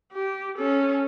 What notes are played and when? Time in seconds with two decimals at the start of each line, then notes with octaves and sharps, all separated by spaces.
0.13 G4
0.58 C#4 A4